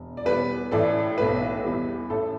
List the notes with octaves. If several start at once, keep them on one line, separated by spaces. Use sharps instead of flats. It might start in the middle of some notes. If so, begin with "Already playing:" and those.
Already playing: E1
D5
E2 B2 G3 B3 B4
A1 A2 E3 A3 A4 D5
B1 A2 A3 B4
E2 E3 G3
A1 A2 A3 A4